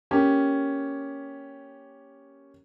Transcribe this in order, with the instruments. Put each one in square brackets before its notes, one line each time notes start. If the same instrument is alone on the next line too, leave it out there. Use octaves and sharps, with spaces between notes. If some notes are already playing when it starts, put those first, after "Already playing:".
[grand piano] A#3 C#4 G4